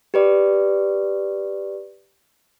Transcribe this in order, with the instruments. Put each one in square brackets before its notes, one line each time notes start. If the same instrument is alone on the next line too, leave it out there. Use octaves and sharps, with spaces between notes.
[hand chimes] G4 B4 D5